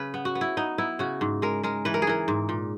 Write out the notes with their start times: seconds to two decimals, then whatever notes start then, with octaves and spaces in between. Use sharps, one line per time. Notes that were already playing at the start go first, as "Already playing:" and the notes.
Already playing: C#3 B4
0.14 B3
0.25 F#4
0.35 B3
0.41 E4
0.57 B3 D#4
0.78 B3 E4
0.99 C#3 F#4
1.21 G#2
1.42 G#3 A#4
1.63 G#3 A#4
1.85 E3 B4
1.94 A#4
2.02 G#4
2.07 E3 A#4
2.28 G#2
2.49 A#2